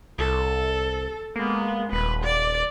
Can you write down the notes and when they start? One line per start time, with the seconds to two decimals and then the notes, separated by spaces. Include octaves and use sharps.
0.19 C2 A4
1.36 G#3 A#3 B3
1.92 D#1 B4
2.23 D5